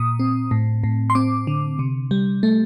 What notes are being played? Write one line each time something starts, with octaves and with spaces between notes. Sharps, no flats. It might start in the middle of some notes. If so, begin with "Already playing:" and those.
Already playing: A#2 D#6
C4
A2
A2
C6
C4 D6
D3
C3
G3
A3